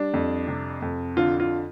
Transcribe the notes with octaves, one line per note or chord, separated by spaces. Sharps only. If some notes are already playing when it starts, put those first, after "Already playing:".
Already playing: G3 D4
F2
C3
F2
D3 F4
F4